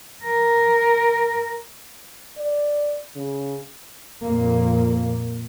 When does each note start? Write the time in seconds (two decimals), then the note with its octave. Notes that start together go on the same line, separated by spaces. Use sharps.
0.24 A#4
2.38 D5
3.16 C#3
4.24 F2 A#2 A#3